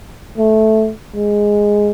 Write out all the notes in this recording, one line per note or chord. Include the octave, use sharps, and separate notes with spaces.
A3
G#3